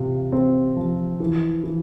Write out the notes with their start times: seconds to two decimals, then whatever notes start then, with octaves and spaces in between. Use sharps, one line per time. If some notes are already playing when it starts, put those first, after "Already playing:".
Already playing: C3 F4
0.32 C4
0.76 F3
1.20 E3
1.64 E3